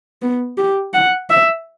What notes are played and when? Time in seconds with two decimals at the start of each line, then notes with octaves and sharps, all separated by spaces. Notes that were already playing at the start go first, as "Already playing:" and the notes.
0.22 B3
0.58 G4
0.94 F#5
1.30 E5